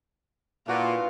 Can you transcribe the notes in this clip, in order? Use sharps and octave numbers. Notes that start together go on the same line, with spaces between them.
A#2 E3 D4 F4 F#4